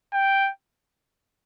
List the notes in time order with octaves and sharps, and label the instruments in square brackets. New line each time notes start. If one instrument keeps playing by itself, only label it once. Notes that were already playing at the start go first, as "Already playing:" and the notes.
[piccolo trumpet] G5